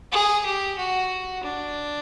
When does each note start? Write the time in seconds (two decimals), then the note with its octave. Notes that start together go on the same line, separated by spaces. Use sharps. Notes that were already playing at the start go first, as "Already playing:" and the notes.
0.12 G#4
0.45 G4
0.79 F#4
1.44 D4